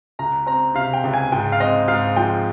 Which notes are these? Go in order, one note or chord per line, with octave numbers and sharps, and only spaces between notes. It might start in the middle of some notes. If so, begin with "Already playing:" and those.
C#2 A#5
C4 A#5
C3 F5
G5
C#2
G#5
G#2 G5
F5
C4 D#5
G#2 F5
F3 G5